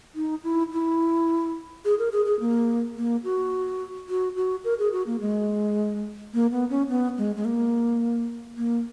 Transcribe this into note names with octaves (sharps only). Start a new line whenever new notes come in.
D#4
E4
E4
G#4
A#4
G#4
G#4
A#3
A#3
F#4
F#4
F#4
A#4
G#4
F#4
A#3
G#3
A#3
B3
C#4
B3
G#3
G#3
A#3
A#3